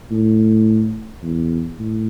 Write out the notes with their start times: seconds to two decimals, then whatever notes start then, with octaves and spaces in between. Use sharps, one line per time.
0.11 A2
1.23 E2
1.79 A2